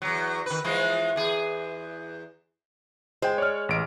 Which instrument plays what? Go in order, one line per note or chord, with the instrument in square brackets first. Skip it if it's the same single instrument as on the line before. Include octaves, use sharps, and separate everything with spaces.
[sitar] E2 F#3
D#3 B4
E3 F3 G#3
E2 G#4
[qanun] G#3 [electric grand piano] C5 G5
[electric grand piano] C#5 D5 F6
A1 D7